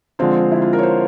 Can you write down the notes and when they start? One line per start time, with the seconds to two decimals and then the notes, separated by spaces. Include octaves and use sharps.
0.19 D3 F3 G#3 C4 F4
0.52 E4
0.62 F4
0.73 A#4
0.79 C#5
0.83 C5